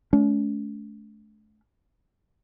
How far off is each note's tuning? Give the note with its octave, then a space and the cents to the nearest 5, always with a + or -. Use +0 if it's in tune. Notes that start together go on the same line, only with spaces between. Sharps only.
A3 -40 C#4 +40